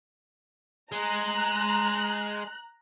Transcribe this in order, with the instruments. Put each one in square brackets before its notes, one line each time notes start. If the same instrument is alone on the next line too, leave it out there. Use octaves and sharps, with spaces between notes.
[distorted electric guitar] G#3 [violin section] A#5 F#6